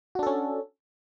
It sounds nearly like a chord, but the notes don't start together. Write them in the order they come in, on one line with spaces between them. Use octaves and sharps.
F#4 D4 A4 C#4